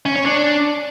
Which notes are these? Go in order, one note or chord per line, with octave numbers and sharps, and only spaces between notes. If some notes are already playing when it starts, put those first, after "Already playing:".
C#4
C#5
D4